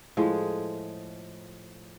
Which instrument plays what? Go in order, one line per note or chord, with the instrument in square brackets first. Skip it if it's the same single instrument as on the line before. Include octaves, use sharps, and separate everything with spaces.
[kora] A2 F3 G#3 G#4